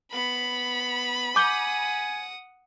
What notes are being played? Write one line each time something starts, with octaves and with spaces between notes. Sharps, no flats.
B3 B5
F#5 G#5 D6 D#6 G6 G7